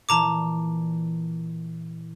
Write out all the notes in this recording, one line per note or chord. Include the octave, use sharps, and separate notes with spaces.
A#2 E3 A5 A#5 D6